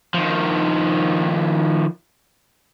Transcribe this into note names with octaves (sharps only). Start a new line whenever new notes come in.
D#3 F3